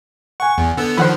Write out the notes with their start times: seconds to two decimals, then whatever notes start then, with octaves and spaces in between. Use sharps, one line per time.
0.40 F#5 G#5 C#6
0.58 E2
0.77 D3 B3 E6
0.97 D3 D#3 F3 C5 F#5 B5